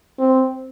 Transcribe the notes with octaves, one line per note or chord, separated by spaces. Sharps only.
C4